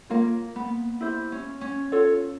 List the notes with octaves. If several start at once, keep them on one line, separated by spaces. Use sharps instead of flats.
A#3 F4 A#4 C#5 F5
B3
E4 G4 C5 E5
C#4
C#4
F4 A4 C#5